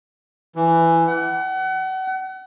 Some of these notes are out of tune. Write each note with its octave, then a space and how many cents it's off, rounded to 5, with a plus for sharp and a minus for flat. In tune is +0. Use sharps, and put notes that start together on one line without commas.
E3 +10
F#5 +35